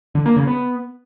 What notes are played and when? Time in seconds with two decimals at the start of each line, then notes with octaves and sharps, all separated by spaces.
0.15 D3
0.26 A#3
0.36 C#3
0.47 B3